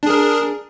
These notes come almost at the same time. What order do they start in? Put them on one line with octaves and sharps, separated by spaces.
D4 G#4 A#4